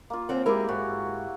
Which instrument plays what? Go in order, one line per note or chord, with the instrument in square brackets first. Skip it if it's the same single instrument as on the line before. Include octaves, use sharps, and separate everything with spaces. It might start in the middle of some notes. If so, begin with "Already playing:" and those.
[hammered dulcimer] A#3 F4
[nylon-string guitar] D#2 C4 F#5
[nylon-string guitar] G#3 A#4 [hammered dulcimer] E4 G4
[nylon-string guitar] G#2 [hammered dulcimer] F#4